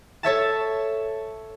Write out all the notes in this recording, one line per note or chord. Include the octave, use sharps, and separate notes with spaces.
A4 C#5 E5 A5